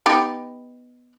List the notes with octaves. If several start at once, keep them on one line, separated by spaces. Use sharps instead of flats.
B3 D#4 G4